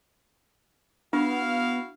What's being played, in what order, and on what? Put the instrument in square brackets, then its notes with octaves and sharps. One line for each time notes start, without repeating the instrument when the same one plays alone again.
[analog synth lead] B3 [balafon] D4 [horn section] E4 F#4 F5